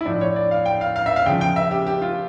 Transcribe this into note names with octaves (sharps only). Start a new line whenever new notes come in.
E4
A2 F3 D4
C#5
D5
F5
G5
F5
F5
E5
F5
C#3 F3 G5
G5
E5
G4
G4
F4